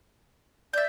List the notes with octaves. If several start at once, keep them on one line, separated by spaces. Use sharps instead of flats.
D5 E5 G6